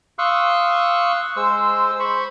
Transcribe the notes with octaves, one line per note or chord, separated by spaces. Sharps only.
F5 C6 C#6 D#6 E6 F#6
G#3 C5 E6
C5 B5 C#6